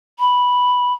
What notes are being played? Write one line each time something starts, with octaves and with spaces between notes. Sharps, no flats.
B5